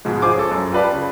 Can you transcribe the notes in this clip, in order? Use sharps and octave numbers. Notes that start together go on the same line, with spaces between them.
G#2 B2 F3 G#3
F4 G#4 C5 G#5 D6
C#4 A4
F#2
F4 G4 B4 D5 A5
C#3